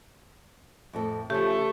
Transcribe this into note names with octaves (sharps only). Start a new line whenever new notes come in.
F2 A2 A4
C#3 F3 A3 G4